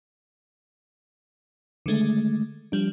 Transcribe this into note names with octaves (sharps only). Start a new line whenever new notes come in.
D3 D#3 G#3 A3
F3 G3 D4